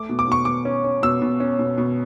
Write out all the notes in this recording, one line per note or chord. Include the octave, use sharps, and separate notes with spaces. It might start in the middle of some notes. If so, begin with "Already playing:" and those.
Already playing: A3 D6
B2
D6
B2 C#6
B2 D6
C#4
C#4
B2 E6
B2
C#4
B2
B2